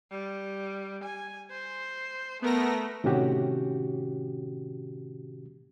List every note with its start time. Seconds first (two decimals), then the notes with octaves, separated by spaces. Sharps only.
0.11 G3
1.04 G#5
1.51 C5
2.42 A3 B3 A#4 A#6
3.04 A2 C3 D#3 C#4 F#4 G4